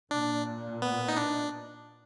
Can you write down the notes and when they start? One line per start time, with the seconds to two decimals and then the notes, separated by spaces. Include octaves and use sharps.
0.11 A#2 D4
0.82 B3
1.08 D#4
1.17 D4